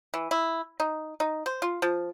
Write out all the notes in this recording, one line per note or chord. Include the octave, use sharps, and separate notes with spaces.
E3
E4
D#4
D#4
C5
F4
F3